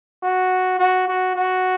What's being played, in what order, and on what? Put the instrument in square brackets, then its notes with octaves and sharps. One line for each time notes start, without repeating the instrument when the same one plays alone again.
[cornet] F#4
F#4
F#4
F#4